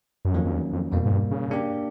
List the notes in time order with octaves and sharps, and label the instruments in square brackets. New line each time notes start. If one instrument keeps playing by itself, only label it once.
[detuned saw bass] F#2
[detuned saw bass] F2 [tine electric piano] D#3 F#3 A#3 C#4
[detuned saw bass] F2
E2
F2
[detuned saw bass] F2 [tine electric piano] B2 G3 A#3
[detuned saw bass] G#2
G2
C#3
[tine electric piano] A#3 D4 G4